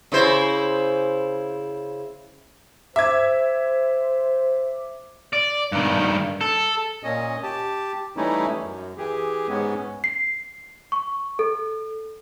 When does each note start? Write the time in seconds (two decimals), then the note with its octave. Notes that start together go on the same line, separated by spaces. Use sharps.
0.12 C#3 E4 C5
2.96 C5 E5 D6 G#6
5.33 D5
5.72 G2 D#3
6.41 A4
7.03 A#2 C#4 D#5
7.43 G4 A5
8.17 E3 G3 A3 C#4 D#4 E4
8.62 F#2
8.98 E3 G4 G#4
9.49 G#2 G#3 B3 C#4
10.04 C7
10.92 C#6
11.39 A4